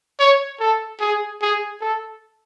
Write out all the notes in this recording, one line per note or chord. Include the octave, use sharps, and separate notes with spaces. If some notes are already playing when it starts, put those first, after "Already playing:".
C#5
A4
G#4
G#4
A4